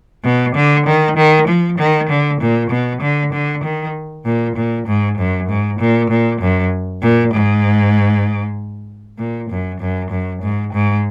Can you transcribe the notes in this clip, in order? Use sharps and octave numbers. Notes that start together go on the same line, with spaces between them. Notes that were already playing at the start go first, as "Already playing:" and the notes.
B2
D3
D#3
D#3
F3
D#3
D3
A#2
B2
D3
D3
D#3
A#2
A#2
G#2
F#2
G#2
A#2
A#2
F#2
A#2
G#2
A#2
F#2
F#2
F#2
G#2
G#2